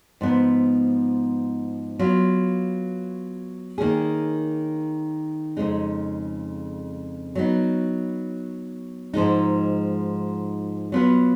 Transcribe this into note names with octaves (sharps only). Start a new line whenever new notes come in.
G#2 F3 B3
F#3 B3 F4
D#3 A#3 C#4 G#4
F2 C#3 G#3 D#4
F#3 B3 D#4
G#2 F3 G#3 D#4
F#3 B3 F4 B4